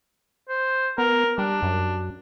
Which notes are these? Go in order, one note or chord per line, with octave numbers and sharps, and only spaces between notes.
C5
B3 A#4
G3 D4
F#2